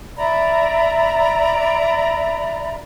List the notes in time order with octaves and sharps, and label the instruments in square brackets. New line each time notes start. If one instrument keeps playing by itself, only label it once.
[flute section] D5 E5 A#5 B5